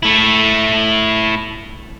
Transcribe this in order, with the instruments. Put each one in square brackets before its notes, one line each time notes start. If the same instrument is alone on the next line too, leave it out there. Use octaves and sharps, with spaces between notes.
[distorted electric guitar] A3 E4